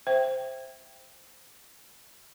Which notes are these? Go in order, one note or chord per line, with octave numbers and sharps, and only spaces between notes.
C5 E5 G5